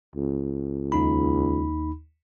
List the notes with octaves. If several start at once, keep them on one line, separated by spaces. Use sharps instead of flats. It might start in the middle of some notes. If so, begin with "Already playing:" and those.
C#2
D#2 D#4 B5